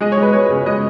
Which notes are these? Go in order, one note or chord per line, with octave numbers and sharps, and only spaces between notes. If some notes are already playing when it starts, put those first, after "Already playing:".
G#3 D#5
C#5
G#3
B4
G#3 C#5
C#3
G#3 D#5